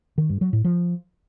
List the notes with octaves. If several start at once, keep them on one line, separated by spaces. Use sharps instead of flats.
D#3
G2
F#3
A2
F3